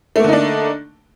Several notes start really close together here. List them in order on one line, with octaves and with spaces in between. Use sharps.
A3 A#3 D3 D#4 D4